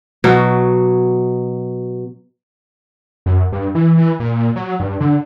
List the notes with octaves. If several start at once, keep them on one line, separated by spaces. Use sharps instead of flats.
B2 F#3
F#2
G2
E3
E3
A#2
F#3
G2
D3